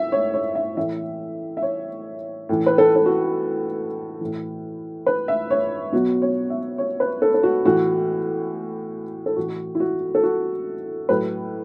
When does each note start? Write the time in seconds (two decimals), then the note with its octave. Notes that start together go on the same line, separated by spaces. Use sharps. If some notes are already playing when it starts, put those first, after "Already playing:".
Already playing: A2 E5
0.12 C#5
0.34 C#5
0.55 E5
0.77 A2 E3 E5
1.57 E5
1.62 C#5
2.49 A2 E3
2.66 B4
2.78 A4
2.96 A4
3.06 F#4
4.21 A2 E3
5.07 B4
5.28 E5
5.51 C#5
5.92 B2 F#3 F#4
6.22 C#5
6.50 E5
6.78 C#5
7.00 B4
7.22 A4
7.34 A4
7.43 F#4
7.65 A2 E3 F#4
9.26 A4
9.36 A2 E3 F#4
9.75 E4
9.80 F#4
10.15 A4
10.23 F#4
11.09 A2 F#3 B4